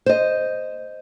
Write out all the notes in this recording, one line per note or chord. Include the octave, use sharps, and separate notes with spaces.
C5 D#5